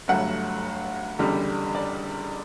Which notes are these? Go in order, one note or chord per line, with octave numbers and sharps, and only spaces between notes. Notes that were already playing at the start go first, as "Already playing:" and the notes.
G1 G2 F#3 A3 F#5
F#1 E2 D3 G3
D5